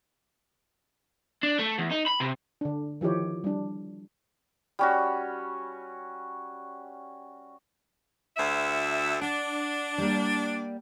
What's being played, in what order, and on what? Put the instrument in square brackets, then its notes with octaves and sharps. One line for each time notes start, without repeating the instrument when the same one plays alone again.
[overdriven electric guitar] D4
A3
E2
D#4
B5
C3
[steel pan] D3 D4
D#3 F3 E4 G4 C#5
G3 D4
[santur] G3 C#4 F#4
[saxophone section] D2 E5
[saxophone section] D4 [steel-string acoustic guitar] F#5
[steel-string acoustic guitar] G3 A#3